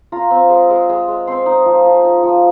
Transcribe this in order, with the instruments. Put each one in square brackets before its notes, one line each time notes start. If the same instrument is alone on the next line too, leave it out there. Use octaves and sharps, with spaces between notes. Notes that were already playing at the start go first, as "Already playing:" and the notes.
[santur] F4 A#5
C4
G#3
G#3
G#3
G#3
C4 C6
D#4
F3
F3
D#4
F3